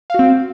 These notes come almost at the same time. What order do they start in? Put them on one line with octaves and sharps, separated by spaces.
F5 F#4 C4